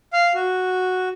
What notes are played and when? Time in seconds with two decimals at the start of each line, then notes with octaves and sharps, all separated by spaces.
0.13 F5
0.34 F#4